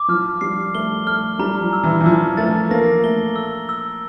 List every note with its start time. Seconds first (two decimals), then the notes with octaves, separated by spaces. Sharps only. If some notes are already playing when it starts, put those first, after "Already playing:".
Already playing: D6
0.08 F3 F6
0.41 G3 C7
0.74 A3 G7
1.07 A3 F6
1.39 G3 A#5
1.61 F3
1.73 E6
1.83 E3
2.00 E3
2.05 F3 E6
2.37 A3 A6
2.71 A#3 A#6
3.04 A3 G7
3.36 E6
3.69 E6